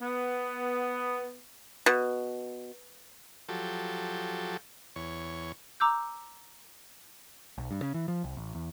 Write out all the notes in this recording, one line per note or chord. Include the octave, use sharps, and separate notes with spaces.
B3
B2
F3 F#3 G4 A4
E2 C#5
A#5 D6 E6 G6
B1
G2
C#3
E3
F3
C2
A1
E2